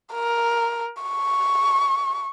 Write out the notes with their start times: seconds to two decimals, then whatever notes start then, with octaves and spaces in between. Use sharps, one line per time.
0.13 A#4
1.03 C#6